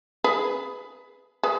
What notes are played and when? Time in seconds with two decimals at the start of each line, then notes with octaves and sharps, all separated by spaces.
0.24 G#4 B4
1.43 G#4 B4